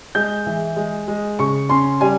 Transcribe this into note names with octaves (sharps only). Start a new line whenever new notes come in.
G#3 G6
E3
G#3
G#3
C#3 C#6
C#4 C6
G3 G#5